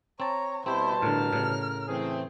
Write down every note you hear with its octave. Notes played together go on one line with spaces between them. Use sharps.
C4 C#5 A5 A#5
B2 G3 C4 E4 G4 C5 A5
A2 D3 A#4 F6
A2 C#3
E3 A3 C4 G#4